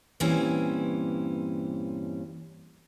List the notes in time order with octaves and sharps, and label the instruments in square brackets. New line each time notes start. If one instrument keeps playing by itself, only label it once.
[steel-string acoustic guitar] G2 A#2 E3 C4 C#4